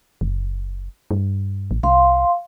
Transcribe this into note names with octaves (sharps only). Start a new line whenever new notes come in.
F#1
G2
A1
C2 F5 C6